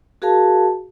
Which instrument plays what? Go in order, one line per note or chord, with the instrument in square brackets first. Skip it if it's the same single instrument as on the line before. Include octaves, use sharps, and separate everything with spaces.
[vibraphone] F#4 G#4 A#4 F5 A5